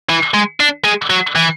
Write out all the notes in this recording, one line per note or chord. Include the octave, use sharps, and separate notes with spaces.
E3
G#3
D4
G#3
F#3
E3